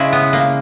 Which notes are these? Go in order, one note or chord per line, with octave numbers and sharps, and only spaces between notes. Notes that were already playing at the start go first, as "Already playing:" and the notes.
Already playing: C#3 G#3 E4
B3
A#3